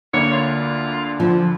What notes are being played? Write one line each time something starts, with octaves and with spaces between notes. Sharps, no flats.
D2 D3 A#3 C#5
F4
F3